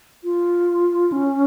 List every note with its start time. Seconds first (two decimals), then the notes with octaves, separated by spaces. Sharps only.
0.24 F4
1.12 C#4